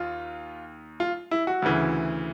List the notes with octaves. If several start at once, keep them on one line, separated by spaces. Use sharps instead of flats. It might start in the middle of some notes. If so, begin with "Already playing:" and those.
Already playing: D#2 F4
F4
E4
F#4
D2 C#3 E3